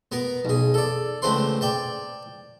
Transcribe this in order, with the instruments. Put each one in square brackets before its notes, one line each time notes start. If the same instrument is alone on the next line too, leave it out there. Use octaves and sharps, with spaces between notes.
[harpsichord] B3 A#4
B1 G#4
A4 D5
C#2 A3 C4 B4 C6
D5 G5 A5